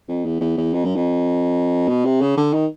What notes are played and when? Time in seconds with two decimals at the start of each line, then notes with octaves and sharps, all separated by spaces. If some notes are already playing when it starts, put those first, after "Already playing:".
0.08 F2
0.25 E2
0.41 E2
0.57 E2
0.74 F2
0.85 F#2
0.96 F2
1.88 B2
2.05 C3
2.21 C#3
2.37 D3
2.53 D#3